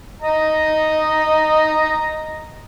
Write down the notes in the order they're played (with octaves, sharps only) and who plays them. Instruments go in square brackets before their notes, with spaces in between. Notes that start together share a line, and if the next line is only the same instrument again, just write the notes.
[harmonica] D#5 A#5